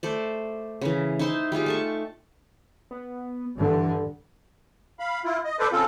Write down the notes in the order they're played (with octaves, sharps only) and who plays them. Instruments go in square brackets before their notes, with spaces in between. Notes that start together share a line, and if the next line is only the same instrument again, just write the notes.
[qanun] A3 C5 D5
C#3 E3
D#4 E4 C5 C6
G3 D#4 F4 G#4
A3 A5 C#6
[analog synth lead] B3
[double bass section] G2 D3 [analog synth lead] E3
[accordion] F5 B5
E4 F4
D#5
A4 B4 C5 D5
C#3 C4 F4 A4